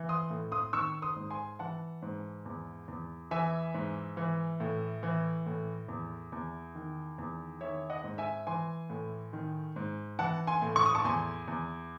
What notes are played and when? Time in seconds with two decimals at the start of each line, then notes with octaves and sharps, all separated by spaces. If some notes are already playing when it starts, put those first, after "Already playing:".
Already playing: E3
0.09 C6 D#6
0.30 A2
0.52 C6 D#6
0.73 D#3 C#6 E6
1.02 C6 D#6
1.16 G#2
1.30 G#5 C6
1.59 E3 F#5 A5
2.02 G#2
2.46 E2
2.88 E2
3.31 E3 E5 G#5
3.74 G#2
4.17 E3
4.60 A2
5.03 E3
5.46 A2
5.88 E2
6.32 E2
6.75 D#3
7.18 E2
7.61 D#3 C#5 E5
7.90 D#5 F#5
8.04 G#2
8.18 E5 G#5
8.47 E3 G#5 C6
8.90 A2
9.33 D#3
9.76 G#2
10.19 E3 F#5 A5
10.47 G#5 C6
10.62 A2
10.76 C#6
10.86 D#6
10.95 A5 C#6
11.05 E2 G#5 C6
11.48 E2